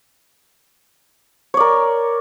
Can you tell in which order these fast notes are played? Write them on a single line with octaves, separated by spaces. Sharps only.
C#5 D5 A#4